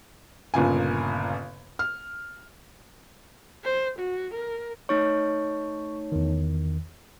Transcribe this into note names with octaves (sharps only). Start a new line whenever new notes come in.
G1 A#2 C#3 G#5
F6
C5
F#4
A#4
A3 D#4 C#5 C#6
E2 D#3